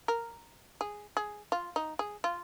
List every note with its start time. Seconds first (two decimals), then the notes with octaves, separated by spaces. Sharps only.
0.08 A#4
0.81 G#4
1.17 G#4
1.52 F4
1.76 D#4
1.99 G#4
2.24 F4